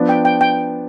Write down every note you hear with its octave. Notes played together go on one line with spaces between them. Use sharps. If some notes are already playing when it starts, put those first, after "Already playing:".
Already playing: F3 B3 D4
G5
G5
G5